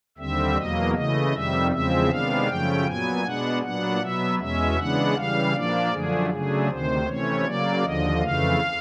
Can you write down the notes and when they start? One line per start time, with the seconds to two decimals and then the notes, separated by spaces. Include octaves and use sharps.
0.18 D#2 D3 G3 C4 E5
0.56 E2 B2 F#3 A#3 D#5
0.95 C#3 E3 A3 D#5
1.33 F2 C3 D#3 G3 E5
1.71 E2 C#3 F3 G#3 C4 E5
2.10 C3 D#3 G#3 B3 D4 F5
2.47 F#2 C#3 F3 A3 C#4 G5
2.86 A#2 F#3 B3 G#5
3.24 B2 G#3 B3 D4 F#5
3.62 A#2 F#3 B3 D4 F#5
4.01 B2 F#3 B3 E5
4.39 E2 B2 G#3 C#4 E5
4.77 C#3 E3 G#3 B3 D4 F#5
5.15 C#3 E3 G3 F5
5.54 A#2 F3 A#3 D4 D5
5.92 F#2 D3 F3 A3 D4 G#4
6.30 C#3 F#3 A3 D4 G#4
6.69 D2 C3 D#3 C5
7.07 C3 E3 A3 C#4 C#5
7.45 C#3 F#3 A#3 D5
7.83 D#2 D3 F3 D#5
8.21 F2 C#3 E3 A3 F5